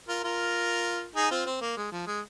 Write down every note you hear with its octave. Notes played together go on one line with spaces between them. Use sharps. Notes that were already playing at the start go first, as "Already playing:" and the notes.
F4 A#4
F4 A#4
D#4 G#4
C4 F4
C4
A#3
G#3
F3
G#3